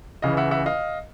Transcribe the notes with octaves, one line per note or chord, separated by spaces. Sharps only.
C#2 C#3 E3 D#5 F5
E5 F#5
E5 F#5
D#5 F5